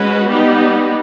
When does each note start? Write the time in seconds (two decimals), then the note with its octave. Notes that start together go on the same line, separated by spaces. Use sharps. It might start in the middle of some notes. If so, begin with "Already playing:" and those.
Already playing: G#3 C#4 F#4 B4
0.27 G3 B3 D#4 G4